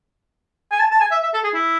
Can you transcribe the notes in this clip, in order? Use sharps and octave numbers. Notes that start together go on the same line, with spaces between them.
G#5
A5
A5
G#5
E5
E5
A4
G#4
E4